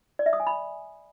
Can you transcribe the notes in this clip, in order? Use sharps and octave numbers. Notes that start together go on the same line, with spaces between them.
D5
E5
D#6
G#5
B5